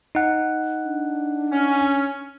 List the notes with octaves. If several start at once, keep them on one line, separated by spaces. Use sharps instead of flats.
D#4 F#5
D4
C#4